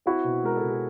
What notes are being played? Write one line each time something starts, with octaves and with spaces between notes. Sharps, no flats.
C4 E4 F#4
B2
G#3 A#4
A4
B2
G#4